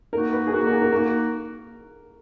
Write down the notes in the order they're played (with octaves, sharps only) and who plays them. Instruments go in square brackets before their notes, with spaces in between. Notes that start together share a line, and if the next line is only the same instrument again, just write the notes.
[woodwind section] A#3 D#4 F#4 [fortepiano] A#4
[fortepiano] B4
G#4
[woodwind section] A#3 D#4 F#4 [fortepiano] A#4
[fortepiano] A#4
G#4
A#4
[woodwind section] A#3 D#4 F#4 [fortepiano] A#4